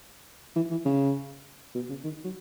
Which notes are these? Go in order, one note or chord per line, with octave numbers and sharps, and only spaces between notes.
E3
E3
C#3
B2
C#3
D#3
F#3